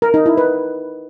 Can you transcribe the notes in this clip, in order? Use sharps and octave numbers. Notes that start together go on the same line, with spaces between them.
A#4
D#4
E4
B4